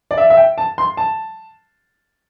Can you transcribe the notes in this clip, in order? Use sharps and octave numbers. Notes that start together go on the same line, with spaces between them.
D5
E5
E5
G5
A5
C6
A5